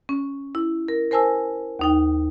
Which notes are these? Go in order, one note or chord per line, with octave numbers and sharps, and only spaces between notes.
C#4
E4
A#4
A#4 C5 G#5 A5 E6
D#2 D#4 G5